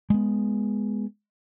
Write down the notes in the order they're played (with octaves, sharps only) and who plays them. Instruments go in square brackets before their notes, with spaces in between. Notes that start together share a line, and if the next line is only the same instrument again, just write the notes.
[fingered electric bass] G#3 B3